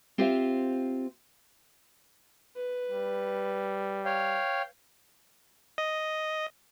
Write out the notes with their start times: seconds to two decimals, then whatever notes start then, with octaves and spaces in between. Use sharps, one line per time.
0.18 C4 F4 G4 C5 E5 F5
2.56 B4
2.89 G3
4.05 C#5 F5 G5
5.78 D#5